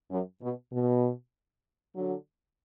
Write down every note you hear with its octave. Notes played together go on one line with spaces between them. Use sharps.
F#2
B2
B2
D3 F#3